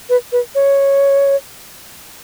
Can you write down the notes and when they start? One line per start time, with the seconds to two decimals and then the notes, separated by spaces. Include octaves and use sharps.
0.10 B4
0.32 B4
0.55 C#5